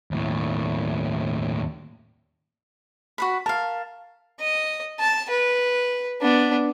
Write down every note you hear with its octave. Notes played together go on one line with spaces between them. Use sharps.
D#2 A2
F#4 B4 B5
A#4 F5 A5
D#5
A5
B4
B3 D4